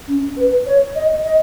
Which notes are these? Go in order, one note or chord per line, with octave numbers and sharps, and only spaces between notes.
C#4
B4
C#5
D#5
D#5